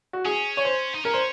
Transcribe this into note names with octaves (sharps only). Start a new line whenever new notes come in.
F#4
C#4 G#4
C#5
C5
D#4
C#4 A#4
C5